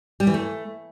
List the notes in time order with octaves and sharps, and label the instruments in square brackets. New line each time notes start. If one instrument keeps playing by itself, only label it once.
[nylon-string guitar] G3
E3
A3